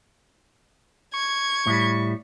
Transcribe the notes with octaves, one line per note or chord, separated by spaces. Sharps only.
C#6 G#6
A2 G3